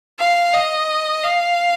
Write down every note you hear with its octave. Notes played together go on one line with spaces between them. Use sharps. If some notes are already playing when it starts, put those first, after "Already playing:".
F5
D#5
F5